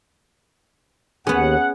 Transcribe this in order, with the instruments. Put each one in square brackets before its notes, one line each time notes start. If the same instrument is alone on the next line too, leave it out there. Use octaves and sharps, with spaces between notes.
[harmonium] D#2 [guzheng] B3 C#4 [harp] G#4 [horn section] F#5